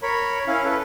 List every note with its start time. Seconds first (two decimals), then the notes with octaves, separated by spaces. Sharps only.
0.02 A#4 C#5 B5
0.47 C#4 E4 F5
0.65 A4 B4